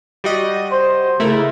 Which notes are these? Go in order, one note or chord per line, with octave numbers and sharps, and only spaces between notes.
G3 F#4 D#5
C5
C#3 A3 E4 A#4